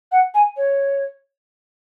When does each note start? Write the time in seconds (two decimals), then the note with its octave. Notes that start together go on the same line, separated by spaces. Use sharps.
0.11 F#5
0.34 G#5
0.57 C#5